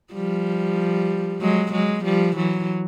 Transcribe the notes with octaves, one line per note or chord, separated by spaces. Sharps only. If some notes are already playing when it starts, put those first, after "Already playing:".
F3 G3
F#3 G#3
F#3 G#3
F3 G3
E3 F#3